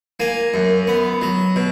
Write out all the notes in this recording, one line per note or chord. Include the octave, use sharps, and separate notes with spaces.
A#3 G#5
F#2
B3
F#3
B2